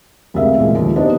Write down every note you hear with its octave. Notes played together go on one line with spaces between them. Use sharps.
D2 C3 G#3 A#4 E5 F5
A#2 E3 G#3
D#2 F3
B3 D4 D#4 G4 C5 D#5